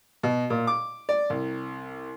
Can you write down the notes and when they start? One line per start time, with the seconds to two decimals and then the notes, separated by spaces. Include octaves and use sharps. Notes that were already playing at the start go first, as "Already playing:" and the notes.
0.23 B2
0.50 A#2
0.67 D6
1.09 D5
1.30 C2